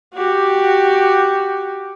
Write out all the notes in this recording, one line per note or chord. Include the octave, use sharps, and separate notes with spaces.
F#4 G4